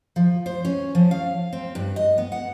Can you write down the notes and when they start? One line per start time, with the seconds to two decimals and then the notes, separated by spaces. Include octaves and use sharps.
0.16 F3
0.46 C5
0.65 C#4
0.95 F3
1.11 F5
1.53 C4
1.75 G2
1.96 D#5
2.18 B3
2.32 F#5